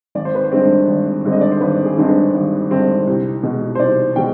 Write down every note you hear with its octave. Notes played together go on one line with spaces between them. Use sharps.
G#1 D5
C5
B4
C5
G2 D3 G#3 C4
G#1
G2 D3 G#3 C4
D#5
D5
C5
G#1 B4
G#4
G2 D3 G#3 C4
B4
G#1
G2 D3 G#3 C4
C2
B2 G#3
C5
C2 D5
B2 G#3 G5